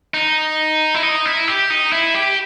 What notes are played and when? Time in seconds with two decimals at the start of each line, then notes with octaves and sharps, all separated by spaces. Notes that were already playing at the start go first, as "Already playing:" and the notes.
0.14 D#4
0.95 E4
1.03 D#4
1.25 E4
1.48 G4
1.70 D#4
1.92 E4
2.14 G4